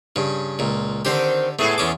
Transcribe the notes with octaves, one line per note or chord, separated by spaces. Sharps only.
G2 C#3
C#2 A#2
D3 D#3 C4 G4 C5
A2 A3 B3 G#4 A4
E2 C#4 D6